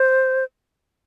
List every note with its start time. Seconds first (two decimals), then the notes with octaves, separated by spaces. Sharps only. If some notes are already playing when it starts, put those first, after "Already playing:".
Already playing: C5